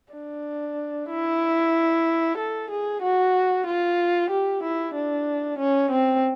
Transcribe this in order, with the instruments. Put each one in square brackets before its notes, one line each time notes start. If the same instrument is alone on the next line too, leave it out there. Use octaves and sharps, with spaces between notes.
[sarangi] D4
E4
A4
G#4
F#4
F4
G4
E4
D4
C#4
C4